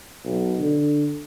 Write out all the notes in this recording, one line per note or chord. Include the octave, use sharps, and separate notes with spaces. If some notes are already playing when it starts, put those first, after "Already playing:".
B1
D3